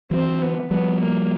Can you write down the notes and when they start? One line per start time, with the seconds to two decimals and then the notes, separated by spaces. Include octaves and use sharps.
0.11 E3 F#3 C4
0.42 B3
0.71 F3 G3 B3
1.00 A#3